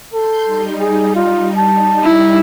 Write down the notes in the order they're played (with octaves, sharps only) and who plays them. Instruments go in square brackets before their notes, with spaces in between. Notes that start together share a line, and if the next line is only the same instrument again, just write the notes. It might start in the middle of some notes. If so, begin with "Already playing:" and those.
[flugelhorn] A4 [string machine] C6 G6
[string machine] G3 D#4
[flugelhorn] G#4
F4
A5
[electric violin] E4